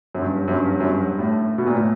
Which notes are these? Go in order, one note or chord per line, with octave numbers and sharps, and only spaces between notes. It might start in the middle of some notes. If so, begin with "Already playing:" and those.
F#2
G2
F#2
G2
F#2
G2
A2
B2
A#2
A2